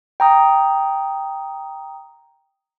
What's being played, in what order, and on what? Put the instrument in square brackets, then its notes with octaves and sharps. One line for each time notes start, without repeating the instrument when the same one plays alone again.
[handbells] G5 A#5 D#6